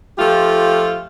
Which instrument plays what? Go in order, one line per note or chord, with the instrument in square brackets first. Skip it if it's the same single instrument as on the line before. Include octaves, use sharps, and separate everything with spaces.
[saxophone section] F3 A3 F4 G4